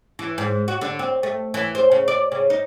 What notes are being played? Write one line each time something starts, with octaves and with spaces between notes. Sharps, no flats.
E3
G#2
F#4
D3
C4
A3
E3
C5
C#3
D5
C#3
D#4